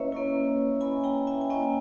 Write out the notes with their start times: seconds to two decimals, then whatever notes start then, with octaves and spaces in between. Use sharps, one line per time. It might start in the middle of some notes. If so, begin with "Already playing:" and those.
Already playing: A#3 C#4 E4 B4 C#5 D#5 E5
0.12 A#3 C#4 E4
0.81 A#3 C#4 E4 G#5 B5
1.04 G5 A#5
1.27 E5 G#5
1.41 G#5
1.50 A#3 C#4 E4 D#5 G5